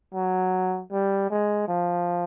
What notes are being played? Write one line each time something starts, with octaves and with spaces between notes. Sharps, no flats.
F#3
G3
G#3
F3